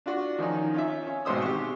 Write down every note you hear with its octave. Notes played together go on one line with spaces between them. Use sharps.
D4 F4 F#4
D#3 F3 C#4 D#4
C#4 F4 E5
C#4
G#1 G#2 B2 C5 D#6 E6
G4 C#6